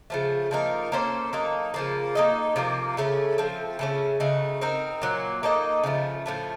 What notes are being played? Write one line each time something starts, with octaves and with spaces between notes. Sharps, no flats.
C#3 F3 A3
F3 A#3 D#4 A#4
A#3 C#4 A4 C5
F#3 A#3 D#4 A4
C#3 F3 A#3
A#3 D#4 A4 D#5
C3 F3 A#3
C#3 A3 C#4 A4
F3 A3 C4
C#3 A3 C#4
C#3 A3 D#4 F#4
C4 D#4 A#4
A#2 F#3 A#3
A#3 D#4 A4 D#5
C#3 F3 A3
A2 F3 A3